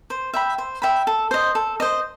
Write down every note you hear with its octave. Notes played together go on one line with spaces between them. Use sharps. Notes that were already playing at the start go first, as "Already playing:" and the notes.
C5
E5 G5 B5
C5
E5 G5 B5
A4
C5 D#5
A4
C5 D#5